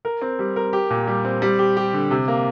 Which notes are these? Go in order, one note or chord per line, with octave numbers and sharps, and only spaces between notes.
A#4
C4
G3
A#4
G4
A#2
G3
C4
G3
G4
G4
D3
C3
A#3